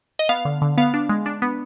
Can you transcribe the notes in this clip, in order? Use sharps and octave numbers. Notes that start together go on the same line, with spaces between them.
D#5
B3 F5
D3
D3
B3 F5
D4
G#3
D4
B3